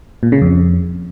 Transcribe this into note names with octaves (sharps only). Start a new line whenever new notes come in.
A#2
C#3
F2